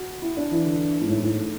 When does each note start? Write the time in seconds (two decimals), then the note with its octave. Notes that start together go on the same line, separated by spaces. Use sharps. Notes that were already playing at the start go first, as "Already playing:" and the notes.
Already playing: F#4
0.22 E4
0.37 D4
0.51 E3
0.65 D3
1.01 G#2
1.09 A2
1.23 A2